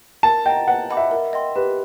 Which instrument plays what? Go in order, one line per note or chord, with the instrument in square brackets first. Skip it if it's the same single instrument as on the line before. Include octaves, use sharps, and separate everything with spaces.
[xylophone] A#4 [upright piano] A5
[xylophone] D#5 F#5 A#5 [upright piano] G5
[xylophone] B4 [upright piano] F#5
[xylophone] D#5 F#5 B5 D6
[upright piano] E5
[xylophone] A#4
D#5 G5 C6
[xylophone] G4 [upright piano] B4